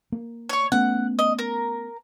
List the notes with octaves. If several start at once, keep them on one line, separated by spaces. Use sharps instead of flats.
A#3
C#5 C#6
A3 B3 C#4 F#5
D#5
A#4